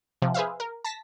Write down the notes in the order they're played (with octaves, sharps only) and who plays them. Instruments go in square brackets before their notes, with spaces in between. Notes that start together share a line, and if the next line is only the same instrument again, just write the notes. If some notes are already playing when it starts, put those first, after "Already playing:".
[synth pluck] C3 F3
G#4 B4 C5 E5 F5
A#4
A5 A#6 B6